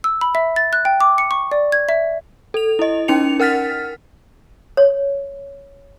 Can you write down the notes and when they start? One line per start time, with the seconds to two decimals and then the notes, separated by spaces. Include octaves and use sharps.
0.04 E6
0.21 B5
0.35 E5
0.56 A6
0.73 F#6
0.85 G5
1.01 D6
1.18 C#7
1.31 C#6
1.51 D5
1.72 G#6
1.89 E5
2.54 A4 F7
2.79 E4 D#5
3.08 C#4 D#4 G5 C#7 F7
3.40 A#4 F#5 F6 A6 B6
4.77 C#5